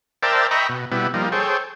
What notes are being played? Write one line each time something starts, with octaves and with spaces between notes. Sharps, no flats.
A#4 C5 D5 E5 G5 A5
D#5 E5 G5 A#5 B5 C#6
B2
B2 G3 B3 E4
F3 G3 A#3 D#4
G#4 A4 C5 C#5 G5